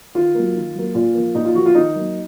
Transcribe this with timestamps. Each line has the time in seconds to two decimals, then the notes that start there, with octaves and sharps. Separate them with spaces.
0.15 D#3 F4
0.35 F#3 A#3
0.55 D#3
0.75 F#3 A#3
0.94 A#2 F4
1.14 F3 A#3
1.35 A#2 D#4
1.45 F4
1.55 F3 A#3 F#4
1.66 F4
1.75 D#3 D#4
1.96 F#3 A#3